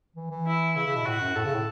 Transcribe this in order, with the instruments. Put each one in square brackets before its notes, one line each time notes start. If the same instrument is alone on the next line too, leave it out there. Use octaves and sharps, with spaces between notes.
[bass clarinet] E3
E3
[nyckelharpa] E4
[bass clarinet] C#3 [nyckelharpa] E4
[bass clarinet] C#3
B2
[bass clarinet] A2 [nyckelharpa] F#4
[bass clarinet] F#2
[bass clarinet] A2 [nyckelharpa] A4
[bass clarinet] C#3
A2